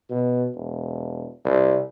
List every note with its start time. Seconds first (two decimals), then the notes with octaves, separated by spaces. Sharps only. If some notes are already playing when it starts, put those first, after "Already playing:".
0.10 B2
0.55 E1
1.45 C2